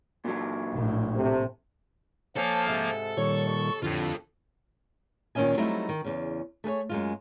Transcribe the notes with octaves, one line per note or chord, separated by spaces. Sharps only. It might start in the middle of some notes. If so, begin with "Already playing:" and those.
A#2 F#3
A#1 A2
C3 A3
F3 A#3 A4 C#5 G#5 A5
G#2 C3
A#2 D#3 G3 C#5 C#6
D#2
F2 A2 D3 F4 A4
A#2 D#3 E3 C#4 D#5 G#5
F#3 G3 A3 C4 D#4 E4
D#3
E2 C#3
A3 G#4 B4 C#5
F#2 G#3 F4